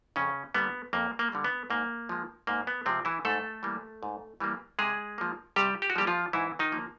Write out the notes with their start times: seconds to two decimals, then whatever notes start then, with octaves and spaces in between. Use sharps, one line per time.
0.16 F2 C#3 C#4
0.54 D3 G3 A#3 B3
0.93 F2 A#3
1.19 A#3
1.32 D3 G3 A#3
1.44 B3
1.70 G#2 A#3
2.09 F3 G#3
2.47 G#2 A#3
2.67 B3
2.86 C3 F3 G#3 C4
3.05 E3 E4
3.25 G#2 A3 A4
3.63 E3 G3 A#3
4.03 G#2
4.40 E3 G3 A#3
4.79 C3 G#3 G#4
5.18 F3 A#3
5.56 C3 G3 G4
5.82 G4
5.90 F#4
5.96 F3 G3 A#3 G4
6.07 F3 F4
6.33 G#2 E3 E4
6.59 D#3 D#4
6.72 F3 A#3